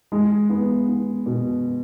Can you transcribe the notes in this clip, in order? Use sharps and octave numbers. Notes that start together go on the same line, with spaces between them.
G#3
B3
B3
B2